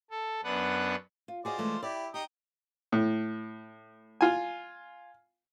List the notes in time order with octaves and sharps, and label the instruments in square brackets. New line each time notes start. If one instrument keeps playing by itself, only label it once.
[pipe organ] A4
F#2 B3 D4 B4 F#5
[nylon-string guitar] F4
[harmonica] F4 C5 D5 [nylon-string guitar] F#4 G#4 D#5
[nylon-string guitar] E3 G#3 A3
[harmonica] E4 G4 [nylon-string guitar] D5
[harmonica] D#4 D#5 G5 [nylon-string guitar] G4
[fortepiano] A2
F4 G#5